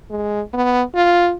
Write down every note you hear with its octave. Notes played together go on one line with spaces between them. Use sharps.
G#3
B3
F4